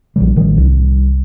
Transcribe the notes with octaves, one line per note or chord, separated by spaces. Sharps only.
A#1 F3 G3
A1 D#3
C2